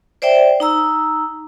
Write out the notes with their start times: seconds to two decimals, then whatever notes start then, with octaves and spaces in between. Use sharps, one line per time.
0.22 C5 D5 E5 G5
0.60 D#4 A#5 E6